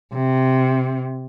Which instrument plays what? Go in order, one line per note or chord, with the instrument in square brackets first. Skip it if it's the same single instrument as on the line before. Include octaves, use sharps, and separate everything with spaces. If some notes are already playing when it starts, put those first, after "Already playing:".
[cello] C3